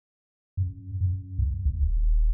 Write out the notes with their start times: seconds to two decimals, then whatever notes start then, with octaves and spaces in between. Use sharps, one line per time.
0.57 F#2
1.00 F#2
1.39 C2
1.65 D2
1.82 D#1